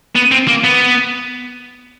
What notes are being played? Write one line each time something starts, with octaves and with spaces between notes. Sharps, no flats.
B3
C4
A#3
B3